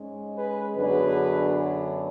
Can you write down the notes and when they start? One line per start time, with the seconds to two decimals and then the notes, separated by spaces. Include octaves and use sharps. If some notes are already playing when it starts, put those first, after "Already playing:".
Already playing: G#2 G#3 C#4
0.34 G#4 B4
0.74 F#2 D3 F#3 B3 D4 G#4 B4